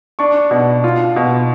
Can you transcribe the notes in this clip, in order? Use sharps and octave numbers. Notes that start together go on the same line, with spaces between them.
D4 C#6
B2
F4
B2